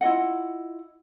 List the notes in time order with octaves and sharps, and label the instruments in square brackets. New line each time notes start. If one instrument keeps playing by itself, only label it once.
[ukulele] E4 F4 D#5 F#5